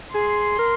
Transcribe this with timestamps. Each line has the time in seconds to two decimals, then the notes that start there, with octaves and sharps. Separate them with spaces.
0.14 G#4 C6
0.59 A#4